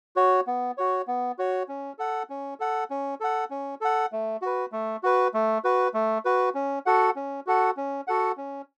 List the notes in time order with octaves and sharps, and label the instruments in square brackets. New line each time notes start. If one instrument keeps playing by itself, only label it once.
[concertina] F#4 C#5
B3
F#4 C#5
B3
F#4 C#5
C#4
A4 F#5
C#4
A4 F#5
C#4
A4 F#5
C#4
A4 F#5
A3
F#4 B4
A3
F#4 B4
A3
F#4 B4
A3
F#4 B4
C#4
F#4 A4 F#5
C#4
F#4 A4 F#5
C#4
F#4 A4 F#5
C#4